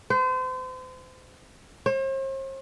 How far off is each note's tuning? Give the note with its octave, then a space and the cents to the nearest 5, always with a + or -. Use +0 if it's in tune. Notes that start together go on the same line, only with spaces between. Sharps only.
C5 -35
C5 +45